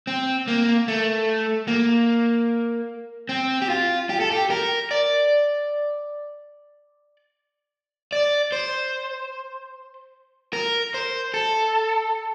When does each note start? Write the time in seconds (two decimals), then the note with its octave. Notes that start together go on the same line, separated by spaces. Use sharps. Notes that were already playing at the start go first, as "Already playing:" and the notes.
0.07 C4
0.48 A#3
0.88 A3
1.68 A#3
3.29 C4
3.62 G4
3.70 F4
4.10 G4
4.20 A4
4.31 G4
4.50 A#4
4.91 D5
8.12 D5
8.52 C5
10.53 A#4
10.94 C5
11.34 A4